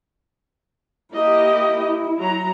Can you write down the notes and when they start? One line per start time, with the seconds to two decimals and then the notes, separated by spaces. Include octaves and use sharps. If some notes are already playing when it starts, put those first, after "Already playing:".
1.14 A#3 E4 G4 D#5
2.19 F#3 A#5